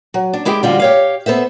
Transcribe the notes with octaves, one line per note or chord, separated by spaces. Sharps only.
F#3
D4
G#3 E4 G4 G#4 G5
D3 F3 G3 G#3 F4 F#4
G4 C#5 F5
B3 A4 C5 E5